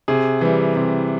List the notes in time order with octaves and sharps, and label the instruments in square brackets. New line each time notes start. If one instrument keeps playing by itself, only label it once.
[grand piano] C3 G#4
E3 G3
C3